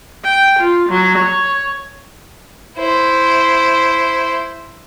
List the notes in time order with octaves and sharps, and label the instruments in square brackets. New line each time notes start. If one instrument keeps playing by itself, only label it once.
[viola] G5
F4
F#3
C#5
[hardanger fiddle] E4 C5